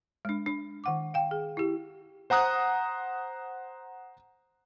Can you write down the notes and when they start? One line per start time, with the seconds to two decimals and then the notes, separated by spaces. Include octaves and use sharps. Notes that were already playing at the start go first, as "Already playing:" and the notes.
0.25 G#3 D4
0.46 D4
0.84 D#3 F#5 D6
1.14 F5 G5
1.31 G#4
1.57 E4 G4
2.30 C5 F#5 A#5 D#6 F#6